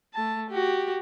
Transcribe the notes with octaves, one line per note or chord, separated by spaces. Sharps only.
A3 A5
F#4 G4